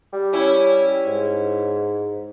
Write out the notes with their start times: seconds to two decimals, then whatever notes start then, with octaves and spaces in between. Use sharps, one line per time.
0.13 G3
0.33 C#4 E4
1.07 G#2